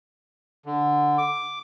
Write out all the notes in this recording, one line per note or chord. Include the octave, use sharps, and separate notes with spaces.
D3
D6